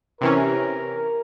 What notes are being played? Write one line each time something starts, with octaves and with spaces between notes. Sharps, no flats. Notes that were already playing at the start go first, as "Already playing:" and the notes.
C3 E3 C#4 A#4